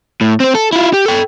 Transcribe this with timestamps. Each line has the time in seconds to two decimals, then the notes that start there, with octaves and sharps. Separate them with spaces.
0.21 A2
0.40 C4 C5
0.55 A4
0.73 E4 F4
0.93 G4
1.06 A4 G5